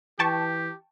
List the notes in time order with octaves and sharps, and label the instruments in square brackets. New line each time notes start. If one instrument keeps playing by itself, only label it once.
[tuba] E3 [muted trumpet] G4 [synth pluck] G5 A5 C#6